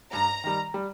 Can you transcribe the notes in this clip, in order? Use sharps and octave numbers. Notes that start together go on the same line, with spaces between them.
G2 A#5
D#3 G3
G3